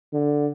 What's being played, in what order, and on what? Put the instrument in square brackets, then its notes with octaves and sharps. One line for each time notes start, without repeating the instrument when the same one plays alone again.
[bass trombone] D3